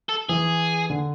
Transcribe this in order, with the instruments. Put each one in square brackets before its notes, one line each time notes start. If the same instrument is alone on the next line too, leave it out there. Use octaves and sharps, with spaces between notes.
[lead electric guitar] A4
[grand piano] E3 [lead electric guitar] G#4
[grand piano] D3